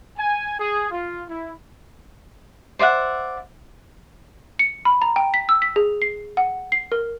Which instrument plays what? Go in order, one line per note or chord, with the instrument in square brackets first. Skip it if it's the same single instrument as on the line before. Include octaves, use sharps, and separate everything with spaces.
[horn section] G#5
G#4
F4
E4
[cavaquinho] C5 D5 E5 F#5
[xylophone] C#7
B5
A#5
G5
B6
E6
B6
G#4
C7
F#5
C7
A#4